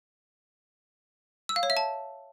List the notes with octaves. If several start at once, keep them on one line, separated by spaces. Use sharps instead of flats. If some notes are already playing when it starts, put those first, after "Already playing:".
E6
F5
C#5
E5
A5